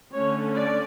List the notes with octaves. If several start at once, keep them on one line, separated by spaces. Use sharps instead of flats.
D3 A3 C#4 C#5
D5